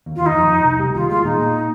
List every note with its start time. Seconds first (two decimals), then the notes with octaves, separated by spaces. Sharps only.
0.06 D#2
0.16 F4
0.21 D#2
0.26 D#4
0.35 F2
0.50 F2
0.64 C2
0.79 G3
0.94 D#2 F4
1.09 G#3 F4
1.24 A#2 D#4
1.39 A#2